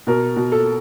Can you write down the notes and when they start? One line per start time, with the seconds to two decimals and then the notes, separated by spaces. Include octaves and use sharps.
0.07 B2 A#4
0.36 B2
0.52 A4